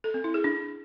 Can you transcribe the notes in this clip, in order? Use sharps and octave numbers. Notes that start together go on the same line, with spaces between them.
A4
C4
E4
G#4
D4